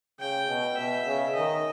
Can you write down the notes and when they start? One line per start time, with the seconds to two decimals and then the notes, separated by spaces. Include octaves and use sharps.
0.20 C#3 G5
0.49 B2
0.77 B2 E5
1.06 C#3
1.35 D#3 D#5